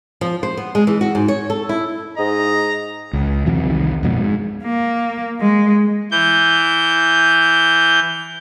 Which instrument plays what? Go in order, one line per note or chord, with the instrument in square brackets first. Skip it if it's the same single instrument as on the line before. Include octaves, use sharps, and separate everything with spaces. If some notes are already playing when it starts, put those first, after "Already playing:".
[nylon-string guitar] F3
C5
B3
G#3
E3
F#4
G#2
C#5
A4
E4
[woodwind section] G#2 D#5 [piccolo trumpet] A#5
[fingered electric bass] C#2
E2 C3 E3 F#3
C2 D#3
F2 G#2 B2
G#2
[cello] A#3
G#3
[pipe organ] E3 G6